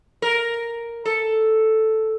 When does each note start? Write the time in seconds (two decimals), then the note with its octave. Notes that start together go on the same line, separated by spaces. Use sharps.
0.22 A#4
1.05 A4